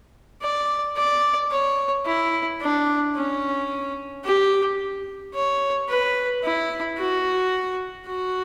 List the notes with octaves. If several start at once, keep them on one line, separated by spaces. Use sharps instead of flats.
D5
D5
C#5
E4
D4
C#4
G4
C#5
B4
E4
F#4
F#4